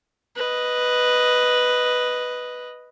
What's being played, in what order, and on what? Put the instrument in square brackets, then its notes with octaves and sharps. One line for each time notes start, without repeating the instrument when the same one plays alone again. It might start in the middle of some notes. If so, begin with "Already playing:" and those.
[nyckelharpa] B4 D#5